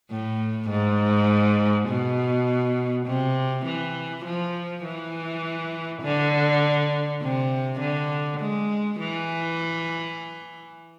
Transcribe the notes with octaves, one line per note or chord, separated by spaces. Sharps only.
A2
G#2
B2
C3
E3
F3
E3
D3
C3
D3
G#3
E3